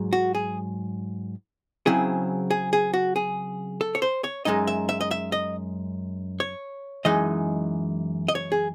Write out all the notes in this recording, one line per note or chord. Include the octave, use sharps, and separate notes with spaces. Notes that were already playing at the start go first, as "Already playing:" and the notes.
Already playing: G#2 F#3
F#4
G#4
C#3 F#3 C4 E4 G#4
G#4
G#4
F#4
G#4
A4
C#5
C5
C#5
F#2 C#3 G#3 D#4 D#5
E5
E5
D#5
E5
D#5
C#5
F#2 E3 G#3 D#4 D#5
D#5
C#5
G#4